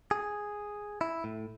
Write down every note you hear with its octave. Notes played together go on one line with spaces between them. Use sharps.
G#4
E4
A2